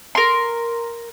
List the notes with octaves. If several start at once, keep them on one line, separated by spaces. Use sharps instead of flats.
A#4 C6